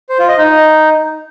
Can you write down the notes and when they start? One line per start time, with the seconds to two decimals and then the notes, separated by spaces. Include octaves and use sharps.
0.09 C5
0.19 F4
0.28 D#5
0.38 D#4